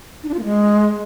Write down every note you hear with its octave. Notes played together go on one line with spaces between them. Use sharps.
D#4
D4
F4
A#3
G#3